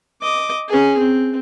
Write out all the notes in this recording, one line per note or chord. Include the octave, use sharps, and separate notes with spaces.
D#5 D6
C#4 G#4
C4